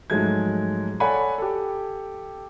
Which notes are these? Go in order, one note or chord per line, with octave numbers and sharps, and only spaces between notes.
G#2 F3 F#3 G#3 A3 G#6
A4 C#5 D5 F#5 G#5 B5
G4 A4